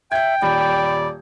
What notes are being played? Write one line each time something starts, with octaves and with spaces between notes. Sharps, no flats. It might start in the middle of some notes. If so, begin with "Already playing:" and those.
E5 G5 G6 G#6
D#1 D5 B5